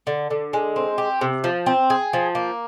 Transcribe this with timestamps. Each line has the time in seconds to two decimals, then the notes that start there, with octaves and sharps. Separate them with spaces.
0.07 D3
0.30 D3
0.53 G#3
0.76 C4
0.98 G4
1.21 C3
1.44 F3
1.66 C4
1.90 G#4
2.13 F3
2.35 A#3